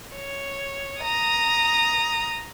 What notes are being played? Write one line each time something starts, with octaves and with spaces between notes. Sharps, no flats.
C#5
A#5 D#6